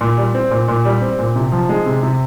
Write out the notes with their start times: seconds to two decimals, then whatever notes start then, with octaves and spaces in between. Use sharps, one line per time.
0.01 A#2
0.18 G3
0.34 C4
0.51 A#2
0.68 A#2
0.85 G3
1.01 C4
1.19 A#2
1.36 C3
1.52 F3
1.69 G#3
1.86 C3
2.03 C3